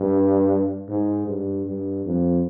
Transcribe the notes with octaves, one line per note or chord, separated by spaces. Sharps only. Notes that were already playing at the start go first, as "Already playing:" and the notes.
Already playing: G2
G#2
G2
G2
F2